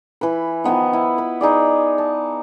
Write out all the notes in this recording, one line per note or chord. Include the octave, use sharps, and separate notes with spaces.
E3 B4
D#3 F3 B3 D#4
E4
B4
D#4 G#4 D5
A5